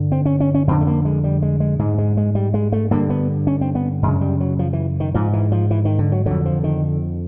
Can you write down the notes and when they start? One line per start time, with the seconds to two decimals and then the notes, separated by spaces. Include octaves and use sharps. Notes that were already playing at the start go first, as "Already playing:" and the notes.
Already playing: G2 D3
0.12 C4
0.26 C#4
0.40 C#4
0.54 C#4
0.68 F2 D3 C4
0.81 A3
0.87 A#3
1.05 G#3
1.24 G3
1.42 G#3
1.60 G#3
1.79 G#2 G#3
1.98 G#3
2.17 G#3
2.35 G3
2.54 G#3
2.72 A3
2.91 G2 D3 A#3
3.10 B3
3.47 C#4
3.61 C4
3.75 B3
4.03 F#2 C#3 G#3
4.21 G3
4.40 F#3
4.59 F3
4.73 E3
5.00 D#3
5.14 G#2 F3
5.33 E3
5.52 F3
5.71 E3
5.85 D#3
5.99 D3
6.12 F#3
6.26 F2 D3 F#3
6.46 F3
6.64 D#3